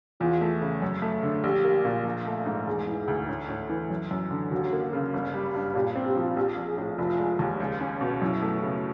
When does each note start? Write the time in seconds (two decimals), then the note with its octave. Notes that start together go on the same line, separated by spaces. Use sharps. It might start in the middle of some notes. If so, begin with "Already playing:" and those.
0.21 E2 F4
0.41 A3
0.61 C#3
0.82 F#2
1.02 A3
1.23 D3
1.44 A#1 G4
1.64 A#3
1.85 A#2
2.05 A#1
2.26 A3
2.46 G#2
2.67 E1 G#4
2.88 E3
3.08 D2
3.29 A2
3.49 A2
3.69 E3
3.90 F#2
4.11 F#2
4.31 D3
4.52 D#2 F#4
4.72 A#3
4.93 C#3
5.14 G1
5.34 G3
5.54 G2
5.75 A#2 G4
5.96 C4
6.06 G4
6.16 F3
6.36 A#1 G4
6.57 A#1
6.67 G#4
6.78 A2
6.98 F1 F4
7.19 G#3
7.39 D#2
7.60 C#2
7.81 C#4
8.01 B2
8.21 F#2 E4
8.42 A3
8.62 C#3